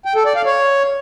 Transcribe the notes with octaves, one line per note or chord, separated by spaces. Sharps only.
G5
A4
D5
F5
C#5